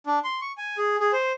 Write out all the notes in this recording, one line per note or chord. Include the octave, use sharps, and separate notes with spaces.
D4
C6
C#6
G#5
G#4
G#4
C5